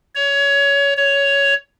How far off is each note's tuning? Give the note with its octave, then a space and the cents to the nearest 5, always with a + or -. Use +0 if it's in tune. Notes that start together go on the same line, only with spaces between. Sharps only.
C#5 +20
C#5 +10